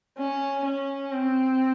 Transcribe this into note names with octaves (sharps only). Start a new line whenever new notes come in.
C#4
C#4
C4